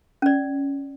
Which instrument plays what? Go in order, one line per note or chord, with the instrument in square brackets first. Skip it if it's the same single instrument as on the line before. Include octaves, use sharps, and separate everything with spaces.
[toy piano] C#4 D5